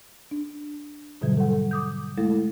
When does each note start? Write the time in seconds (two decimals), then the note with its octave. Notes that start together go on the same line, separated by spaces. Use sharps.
0.31 D4
1.21 G#2 B2 D3 F#3 G3
1.37 A4 F#5
1.71 D6 D#6 G6
2.18 G#3 A3 E4 A4